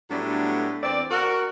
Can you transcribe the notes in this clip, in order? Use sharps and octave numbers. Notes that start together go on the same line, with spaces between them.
A2 F#3 G3 A3 B3 D4
E2 C4 D5
F#4 A#4